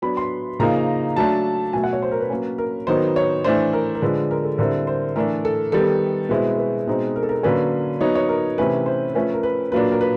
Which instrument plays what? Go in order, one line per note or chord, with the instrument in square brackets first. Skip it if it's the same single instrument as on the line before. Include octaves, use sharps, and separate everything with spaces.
[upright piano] F#3 B3 D4 B5
C6
C#3 F3 A#3 D#4 A#5
F#3 A3 D4 A5
B2 F#3 A3 G#5
F#5
C#5
C5
A#4
B4
F#3 A#3 C#4
A#4
D#3 F#3 B3 D#4 C5
C#5
E3 A3 D4 C5
A#4
A#4
D3 F3 G#3 B4
A#4
A4
D3 G3 C4 E4 A#4
C5
E3 A3 D4 A#4
A4
D#3 G3 B3 A4
B2 G#3 C4 E4 B4
B4
B2 G#3 C4 D#4
A#4
A4
A#4
D3 F#3 A#3 C#4 B4
F#3 B3 D#4 C#5
C#5
A#4
C3 E3 A3 C#4 E4 B4
C5
F3 A3 C#4 B4
A#4
B4
A#2 F#3 A#3 D4 B4
A#4
B4